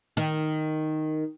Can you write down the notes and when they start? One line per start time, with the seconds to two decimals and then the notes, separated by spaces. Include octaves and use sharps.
0.17 D#3